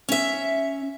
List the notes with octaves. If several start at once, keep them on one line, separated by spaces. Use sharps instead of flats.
C#4 E5